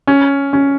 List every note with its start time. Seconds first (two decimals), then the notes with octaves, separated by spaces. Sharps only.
0.07 C#4
0.53 C#4